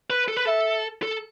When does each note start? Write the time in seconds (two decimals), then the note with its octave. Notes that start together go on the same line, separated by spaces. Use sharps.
0.10 B4
0.28 A4
0.37 B4
0.45 A4 E5
1.03 A4